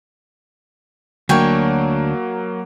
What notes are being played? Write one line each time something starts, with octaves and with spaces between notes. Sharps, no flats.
D2 F#3 A#3 D4 C#5 G5 G#5